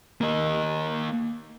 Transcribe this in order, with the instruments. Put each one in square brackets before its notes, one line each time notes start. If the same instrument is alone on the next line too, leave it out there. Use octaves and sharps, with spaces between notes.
[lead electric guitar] A#3 D#5